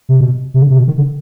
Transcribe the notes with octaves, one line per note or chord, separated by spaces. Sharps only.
C3
B2
C3
D3
C3
B2
D#3
D3